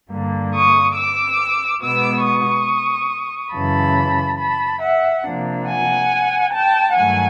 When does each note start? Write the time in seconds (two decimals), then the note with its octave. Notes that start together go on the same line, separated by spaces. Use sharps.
0.11 G2 D3 G3 A#3
0.54 C#6 D#6
0.97 D6 E6
1.82 B2 G#3 B3 D6 E6
2.25 C#6 D#6
3.54 F#2 C#3 E3 A5 B5
4.39 A5 B5
4.83 E5 F#5
5.26 C3 F3 A#3 D4
5.68 F#5 G#5
6.53 G5 A5
6.96 G2 D#3 F#3 A3 F#5 G#5